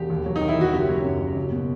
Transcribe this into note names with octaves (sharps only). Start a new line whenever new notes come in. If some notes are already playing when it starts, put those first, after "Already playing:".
Already playing: E1 G4
D#2
F#3
D#4
D#3
E4
D#2 F#4
F#1 G4
F#3
F#2
F#1
F#1
B2